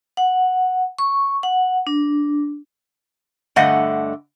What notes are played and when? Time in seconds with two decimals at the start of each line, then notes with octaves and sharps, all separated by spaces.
0.17 F#5
0.99 C#6
1.43 F#5
1.87 D4
3.56 G2 D3 A3 D#5 F#5